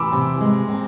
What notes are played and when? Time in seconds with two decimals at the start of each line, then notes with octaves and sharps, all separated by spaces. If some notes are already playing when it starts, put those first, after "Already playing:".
Already playing: E3 B5 D6 E6
0.13 C3
0.41 G#3
0.69 C4